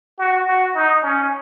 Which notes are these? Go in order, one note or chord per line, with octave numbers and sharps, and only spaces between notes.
F#4
F#4
D#4
C#4